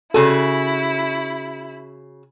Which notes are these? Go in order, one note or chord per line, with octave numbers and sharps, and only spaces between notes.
C#3 E4 F#4 A4 G#5